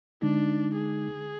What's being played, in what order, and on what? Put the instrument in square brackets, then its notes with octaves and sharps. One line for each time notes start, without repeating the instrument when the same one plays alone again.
[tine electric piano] D3 G#3 D#4 [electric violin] D4
[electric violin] G#4